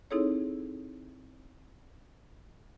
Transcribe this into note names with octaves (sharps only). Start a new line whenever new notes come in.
C4 D#4 E4 G#4 A4 C#5